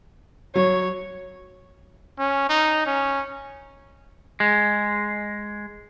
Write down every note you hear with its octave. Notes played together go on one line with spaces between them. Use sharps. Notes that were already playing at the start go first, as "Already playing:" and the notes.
F#3 C#5
C#4
D#4
C#4
G#3